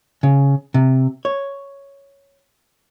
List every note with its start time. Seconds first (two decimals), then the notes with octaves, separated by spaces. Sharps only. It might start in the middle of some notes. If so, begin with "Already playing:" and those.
0.23 C#3
0.74 C3
1.25 C#5